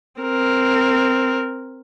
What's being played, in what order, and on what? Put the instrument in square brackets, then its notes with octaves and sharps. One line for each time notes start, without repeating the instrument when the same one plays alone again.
[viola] C4 A#4